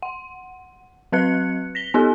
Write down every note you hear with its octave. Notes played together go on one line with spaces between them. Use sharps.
F#5
F#3 C4 B4 F#6 C#7
A#6 B6 G7
B3 D#4 G4 A4